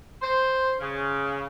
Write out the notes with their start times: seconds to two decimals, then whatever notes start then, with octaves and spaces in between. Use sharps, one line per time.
0.22 C5
0.80 C#3